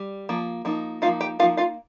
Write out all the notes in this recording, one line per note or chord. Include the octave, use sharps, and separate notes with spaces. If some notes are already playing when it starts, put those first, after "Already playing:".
Already playing: G3
F3 A#3
F3 A#3 D#4
F3 A#3 D#4 F4 F5
G4 G5
F3 A#3 D#4 F4 F5
F4 F5